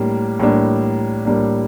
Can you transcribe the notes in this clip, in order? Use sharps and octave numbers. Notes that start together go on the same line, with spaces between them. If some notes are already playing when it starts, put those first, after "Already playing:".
Already playing: A2 G3 A#3 D4
A2 G3 A#3 D4
A2 G3 A#3 D4